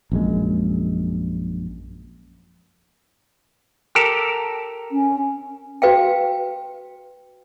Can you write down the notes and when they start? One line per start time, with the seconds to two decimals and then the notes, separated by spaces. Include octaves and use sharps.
0.12 A#1 F#2 G#3
3.95 G4 A4 A#4
4.92 C#4
5.82 F#4 B4 F5 G5